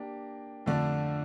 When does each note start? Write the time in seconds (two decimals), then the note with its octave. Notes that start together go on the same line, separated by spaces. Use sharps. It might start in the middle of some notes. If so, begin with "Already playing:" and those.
Already playing: A#3 D4 G4
0.66 F2 D3 A3 D4